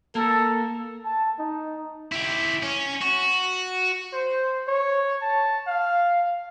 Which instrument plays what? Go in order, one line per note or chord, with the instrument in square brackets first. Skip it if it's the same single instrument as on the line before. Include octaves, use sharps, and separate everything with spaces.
[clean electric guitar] A#3 A#4 [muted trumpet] A4
[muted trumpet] A5
D#4
[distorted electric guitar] E4 G4
C#4
F#4
[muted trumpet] C5
C#5
A5
F5